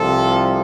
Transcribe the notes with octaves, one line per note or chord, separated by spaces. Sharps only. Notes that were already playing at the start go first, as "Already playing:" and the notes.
Already playing: C2 C3 F3 A4